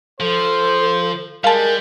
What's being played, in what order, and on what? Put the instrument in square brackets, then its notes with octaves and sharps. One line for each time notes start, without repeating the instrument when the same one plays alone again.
[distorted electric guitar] F3 [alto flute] A4 [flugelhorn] C5
[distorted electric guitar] G3 [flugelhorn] G#3 [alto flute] A#4 [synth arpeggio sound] F5 A5